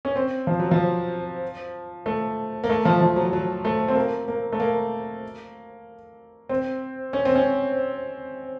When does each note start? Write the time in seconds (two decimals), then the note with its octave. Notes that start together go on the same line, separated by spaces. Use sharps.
0.05 C#4
0.16 C4
0.47 F3
0.60 F#3
0.71 F3
2.06 A3
2.64 A#3
2.70 A3
2.85 F3
3.01 F3
3.16 F#3
3.33 F#3
3.65 A3
3.88 C4
3.96 A#3
4.28 A#3
4.52 A3
4.60 A#3
6.49 C4
7.13 C#4
7.25 C4
7.35 C#4